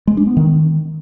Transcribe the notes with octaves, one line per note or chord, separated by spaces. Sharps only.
G#3
D4
B3
D#3